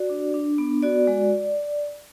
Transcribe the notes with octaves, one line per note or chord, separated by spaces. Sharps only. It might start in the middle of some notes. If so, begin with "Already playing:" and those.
Already playing: F#4 D5
D4
D4
B3
F#4 D5
G#3